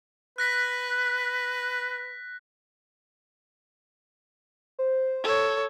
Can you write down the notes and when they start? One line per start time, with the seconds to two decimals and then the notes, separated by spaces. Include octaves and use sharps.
0.38 B4 F#6 A#6 B6
4.79 C5
5.24 A4 C#5